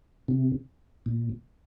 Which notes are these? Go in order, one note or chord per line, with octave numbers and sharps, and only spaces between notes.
C3
A#2